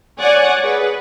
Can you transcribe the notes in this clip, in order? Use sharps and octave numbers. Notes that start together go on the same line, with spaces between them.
C#5 D5 F#5 G#5
G#4 B4